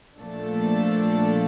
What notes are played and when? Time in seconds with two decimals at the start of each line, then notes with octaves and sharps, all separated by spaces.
0.19 A#2 F3 A3 D4 A4